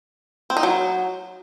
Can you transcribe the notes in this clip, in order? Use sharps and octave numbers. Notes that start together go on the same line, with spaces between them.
C4
D#4
F#3